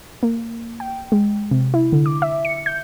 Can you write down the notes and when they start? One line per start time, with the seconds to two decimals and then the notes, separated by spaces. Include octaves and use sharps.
0.23 A#3
0.80 G5
1.12 G#3
1.51 C3
1.74 E4
1.93 D3
2.06 D6
2.22 E5
2.45 C#7
2.66 G6